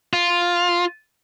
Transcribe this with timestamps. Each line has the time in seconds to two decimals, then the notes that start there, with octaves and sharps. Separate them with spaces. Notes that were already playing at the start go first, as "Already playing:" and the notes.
0.13 F4